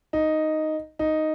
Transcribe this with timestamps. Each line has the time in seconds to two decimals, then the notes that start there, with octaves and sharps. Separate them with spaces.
0.13 D#4
0.99 D#4